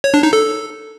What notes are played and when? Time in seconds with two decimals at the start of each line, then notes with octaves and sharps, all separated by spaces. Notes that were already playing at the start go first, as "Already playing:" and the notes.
0.04 C#5
0.14 D4
0.23 D#4
0.33 A4